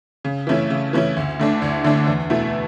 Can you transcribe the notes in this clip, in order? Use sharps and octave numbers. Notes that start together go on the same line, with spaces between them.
C#3
E3 A3 C#4 E4
C#3
E3 A3 C#4 E4
D2
D3 A3 D4
D2
D3 A3 D4
E2
B2 A3 E4